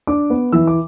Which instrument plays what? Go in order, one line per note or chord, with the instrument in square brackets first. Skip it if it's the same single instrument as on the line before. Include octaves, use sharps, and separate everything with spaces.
[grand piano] D4 D6
B3
E3 E6
D6